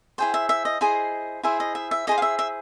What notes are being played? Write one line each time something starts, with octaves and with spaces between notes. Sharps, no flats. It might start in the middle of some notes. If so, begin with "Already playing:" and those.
E4 G#4 C5 G5
E5
E5
D#5
E4 G#4 C5 D#5
E4 G#4 C5 E5
D#5
E5
E5
E4 G#4 C5 D#5
F5
E5
E5